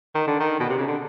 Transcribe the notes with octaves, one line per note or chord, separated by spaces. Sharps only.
D#3
D3
D#3
B2
C3
C#3
D3